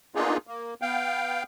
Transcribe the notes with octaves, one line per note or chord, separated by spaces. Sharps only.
A#3 B3 D4 D#4 F4 G#4
A#3
B3 F5 G5